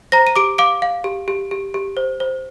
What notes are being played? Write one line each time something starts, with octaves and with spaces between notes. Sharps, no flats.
C5 A#5 A#6
D#7
G4 D6 D7
F5 D6 D7
F5
G4
G4
G4
G4
C5
C5